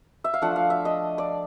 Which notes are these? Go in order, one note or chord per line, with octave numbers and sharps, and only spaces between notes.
E5
F5
F3 A3 D4 F#5
F5
E5
D#5
D5